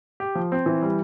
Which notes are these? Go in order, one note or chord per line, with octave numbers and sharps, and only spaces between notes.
G4
F3
C4
E3
G3